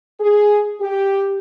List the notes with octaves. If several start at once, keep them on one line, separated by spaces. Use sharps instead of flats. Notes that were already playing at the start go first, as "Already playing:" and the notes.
G#4
G4